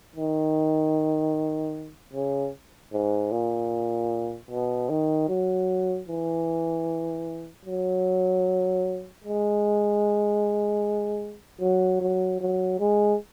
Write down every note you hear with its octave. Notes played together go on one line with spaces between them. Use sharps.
D#3
C#3
G#2
A#2
B2
D#3
F#3
E3
F#3
G#3
F#3
F#3
F#3
G#3